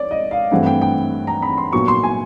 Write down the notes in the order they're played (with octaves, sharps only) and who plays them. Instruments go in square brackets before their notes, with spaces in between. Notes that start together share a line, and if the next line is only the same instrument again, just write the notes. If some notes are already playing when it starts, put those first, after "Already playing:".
Already playing: [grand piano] C#5 D5
D#5
F5
G2 E3 A3 C4 F#5
G5
G5
A#5
B5
C6
A#2 F#3 B3 C#6
C6
G#5